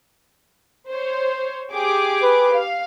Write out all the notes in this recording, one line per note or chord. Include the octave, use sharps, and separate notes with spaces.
C5 C#5
G4 G#4 D6
B4
F5